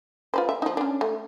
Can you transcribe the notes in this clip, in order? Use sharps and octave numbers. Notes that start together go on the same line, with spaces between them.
F4 B4 C5
E5
F3 D#4
C#4 D4
A3